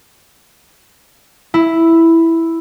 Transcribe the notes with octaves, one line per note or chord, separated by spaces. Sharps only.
E4